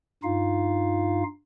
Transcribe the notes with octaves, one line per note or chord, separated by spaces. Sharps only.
G2 D#4 F4 F5